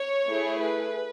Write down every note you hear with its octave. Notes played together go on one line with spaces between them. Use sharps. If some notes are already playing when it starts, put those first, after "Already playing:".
Already playing: C#5
A3 E4 G#4
B4